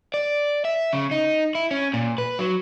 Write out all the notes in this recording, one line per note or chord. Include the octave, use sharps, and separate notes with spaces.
D5
E5
C#3
D#4
E4
C#4
A#2
B4
F#3